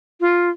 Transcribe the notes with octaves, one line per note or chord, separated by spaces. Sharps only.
F4